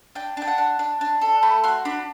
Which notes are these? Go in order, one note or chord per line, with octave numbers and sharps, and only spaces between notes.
D4 G5
D4 G5
F#5
D4
D4
D4
A4
A3 B5
F#4 C6
D4 B5